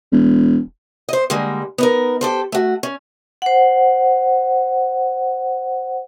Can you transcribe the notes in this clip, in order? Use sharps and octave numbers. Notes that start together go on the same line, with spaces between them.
E1
C5 D#5
D3 G3 G#3 A#3
B3 D#4 A#4
G4 A4 C5
A3 F#4
C#4
C5 F#5